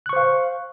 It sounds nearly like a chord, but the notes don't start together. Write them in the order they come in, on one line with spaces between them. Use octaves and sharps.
F#6 C#6 C5 F5